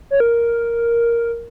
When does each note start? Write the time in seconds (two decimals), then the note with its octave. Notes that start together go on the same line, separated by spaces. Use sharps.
0.11 C#5
0.20 A#4